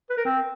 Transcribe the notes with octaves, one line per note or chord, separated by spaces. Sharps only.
B4
A#4
C4